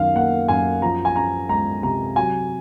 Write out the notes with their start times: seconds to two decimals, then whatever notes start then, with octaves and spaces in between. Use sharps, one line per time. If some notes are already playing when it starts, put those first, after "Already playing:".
Already playing: F#2 D#3 F5
0.15 A#3 F#5
0.48 F#2 G#5
0.82 F3 A#5
1.05 G#5
1.16 C#4 A#5
1.49 G#3 A#5
1.83 C3 A#5
2.16 F#3 G#5